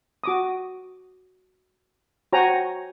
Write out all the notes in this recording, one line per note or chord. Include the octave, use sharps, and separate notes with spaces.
F#4 D6 D#6
F#4 C5 C#5 G5 G#5 A#5